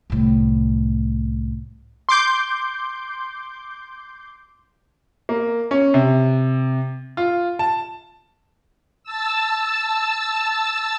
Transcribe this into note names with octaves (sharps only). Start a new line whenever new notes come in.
C2 A2
C6 D6 G6
A#3
C#4
C3
F4
A5
A5 E6